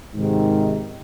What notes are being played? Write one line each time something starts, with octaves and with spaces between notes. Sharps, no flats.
G#2 C3 D#3